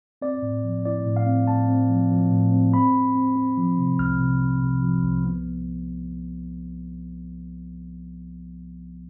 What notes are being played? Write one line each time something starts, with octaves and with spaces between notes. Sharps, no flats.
C4 D5
A2
F3
E4 D5
A2
F5
C4
A2 A5
C4
F3
F3
A2
C4
C4 B5
C4
C4
C4
F3
C3
C2 F6
C3
C3
C3
F3
C2
B3